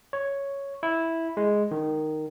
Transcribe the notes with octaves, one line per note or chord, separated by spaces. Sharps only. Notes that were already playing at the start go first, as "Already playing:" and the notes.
C#5
E4
G#3
D#3